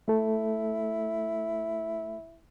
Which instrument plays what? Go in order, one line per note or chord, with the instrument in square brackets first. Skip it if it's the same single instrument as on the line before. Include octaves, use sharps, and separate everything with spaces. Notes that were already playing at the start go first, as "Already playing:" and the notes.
[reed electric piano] A3 A4 [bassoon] E4